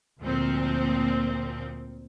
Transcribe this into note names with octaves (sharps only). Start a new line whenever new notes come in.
D2 A#2 F3 C4